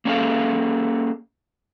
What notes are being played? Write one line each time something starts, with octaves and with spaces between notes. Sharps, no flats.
A#3 C#4 D4 G#4 A4 F5